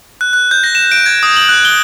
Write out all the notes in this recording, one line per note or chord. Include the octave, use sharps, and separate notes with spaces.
F#6
F#6
G6
A#6
E7
D7
G#6
D#6
F#7
F#6
G7